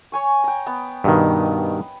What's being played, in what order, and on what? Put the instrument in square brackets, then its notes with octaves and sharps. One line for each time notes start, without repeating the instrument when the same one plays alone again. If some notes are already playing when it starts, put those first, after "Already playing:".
[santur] C#5 G#5 C#6
G5 A#5
B3
[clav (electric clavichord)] G2 B2 D#3 [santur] D#5